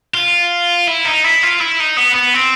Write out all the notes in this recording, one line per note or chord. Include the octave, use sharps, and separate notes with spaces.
F4
E4
D#4
E4
F4
E4
D#4
B3
B3
C4